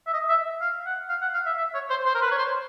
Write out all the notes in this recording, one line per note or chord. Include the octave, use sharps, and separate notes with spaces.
E5
D#5
E5
F5
F#5
F5
F#5
F5
E5
E5
C#5
C5
C5
A#4
B4
C#5
C5